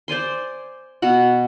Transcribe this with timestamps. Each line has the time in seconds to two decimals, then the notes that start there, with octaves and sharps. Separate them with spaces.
0.08 C5 D5 G#5 C6
1.02 B2 F#4 F#5